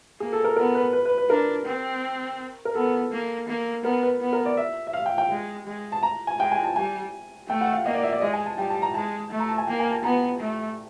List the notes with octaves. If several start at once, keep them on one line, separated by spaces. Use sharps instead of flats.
A#3 G#4
A4
A#4
B3 A#4
B4
B4
B4
B4
D4 A#4
C4
A#4
B3 A4
A#3
A#3
B3 A#4
B4
B3
A#4
D5
E5
E5
F5
G5
G5
G#3
G#3
A5
A#5
G#5
G#3 G5
G#5
A5
G3 G#5
A3 G5
F#5
F5
A#3 D#5
D5
E5
D5
G#3 D#5
G#5
A5
G3 G5
A5
A#5
G#3 A5
A3
A#5
A5
G#5
A#3 G5
G#5
A5
B3 A#5
A3